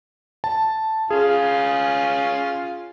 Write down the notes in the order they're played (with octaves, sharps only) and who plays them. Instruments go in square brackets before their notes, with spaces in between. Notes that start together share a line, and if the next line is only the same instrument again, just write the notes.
[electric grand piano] A5
[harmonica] C#4 F4 F5 [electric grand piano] G#4